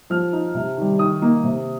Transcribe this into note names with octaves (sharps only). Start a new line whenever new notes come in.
F3 F6
D#4
C3
D#3 G3
D#3 D#6
A#3 D#4
C3